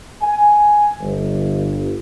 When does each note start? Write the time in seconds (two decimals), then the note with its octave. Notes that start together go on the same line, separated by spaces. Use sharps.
0.22 G#5
1.01 G1